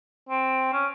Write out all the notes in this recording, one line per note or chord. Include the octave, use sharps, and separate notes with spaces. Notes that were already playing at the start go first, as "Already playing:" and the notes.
C4
C#4